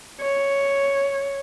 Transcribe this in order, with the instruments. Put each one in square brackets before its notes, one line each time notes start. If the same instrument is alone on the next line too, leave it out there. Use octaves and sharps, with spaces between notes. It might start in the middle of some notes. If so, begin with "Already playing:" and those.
[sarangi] C#5